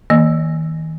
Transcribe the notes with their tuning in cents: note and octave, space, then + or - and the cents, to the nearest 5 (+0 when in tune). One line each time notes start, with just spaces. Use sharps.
D#3 +45 A#3 +0 D#5 -20